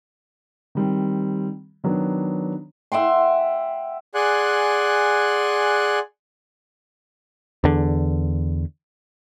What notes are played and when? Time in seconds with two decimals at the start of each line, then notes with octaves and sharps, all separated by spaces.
0.75 D#3 G3 C4
1.84 D#3 F#3 B3 D4
2.92 E5 F#5 G5 C6
4.15 G#4 D5 F#5 G#5 C6 F#6
7.64 E2 D3